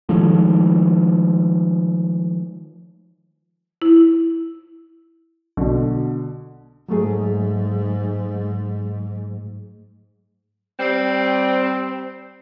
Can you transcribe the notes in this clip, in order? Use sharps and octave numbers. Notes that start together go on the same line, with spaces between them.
D#3 F3 G#3 A3
E4
B1 B2 D3
G#2 F#3 A3 G#4
G3 C4